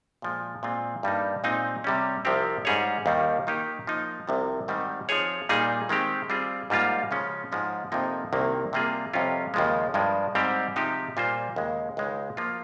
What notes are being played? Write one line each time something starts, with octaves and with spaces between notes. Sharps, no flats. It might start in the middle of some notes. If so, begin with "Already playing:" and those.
A#2 F3 G#3
A#2 G#3 C4 F4
G2 G3 A#3 D#4
A#2 G#3 C4 D#4
C3 G3 C#4
C2 C3 F3 C4 G4
G#2 G3 C#4 G#4 C#5
D#2 D#3 G3 A#3 D#4
D#3 A#3 D#4 G4
F3 A#3 D#4
C2 C3 F3
G#2 D#3 G3 C4 D#4
F3 C4 D#4 G#4 C#5
A#2 G3 A#3 D#4 G#4
D#3 G#3 C4 G4
G3 C4 F4 G#4
G#2 G3 A#3 F4
C#3 F3 G#3 C#4
G#2 F3 G#3 C#4
F2 C3 F3 A#3 D#4
C2 C3 D#3 A#3
C3 G3 A#3 F4 G#4
F2 C3 G3 C#4 F4
D#2 C#3 F3 G#3
G2 F3 G#3
G#2 G3 C4 G4
C3 F3 G#3 D#4 G4
A#2 G3 A#3 F4 C5
D#2 C#3 G#3
C#2 C#3 G#3 D#4
F3 A#3 F4